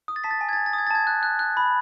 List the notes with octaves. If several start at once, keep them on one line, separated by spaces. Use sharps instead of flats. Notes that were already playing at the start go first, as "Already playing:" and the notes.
D#6
A6
A5 B6
A6
G#5 B6
G#6
A6
G#5
A6
D#6
G#6
A6
A5 G#6
F#6
F#6
F#6
B5